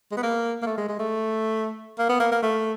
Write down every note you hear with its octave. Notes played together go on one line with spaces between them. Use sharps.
G#3
B3
A#3
A#3
A3
G#3
G#3
A3
A#3
B3
A#3
A#3
A3